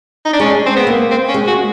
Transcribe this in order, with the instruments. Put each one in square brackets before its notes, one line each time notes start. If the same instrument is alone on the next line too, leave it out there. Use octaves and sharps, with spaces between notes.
[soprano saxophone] D#4
D4
[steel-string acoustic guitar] G#3 [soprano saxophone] C#4
[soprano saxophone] C4
B3
[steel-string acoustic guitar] A#3
[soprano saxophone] C4
C#4
[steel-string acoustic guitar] G#3
[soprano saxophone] F#4